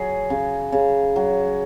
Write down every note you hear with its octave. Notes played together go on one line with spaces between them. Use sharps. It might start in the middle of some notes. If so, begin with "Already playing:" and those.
Already playing: F#3 G#4
C#3
C#3
F#3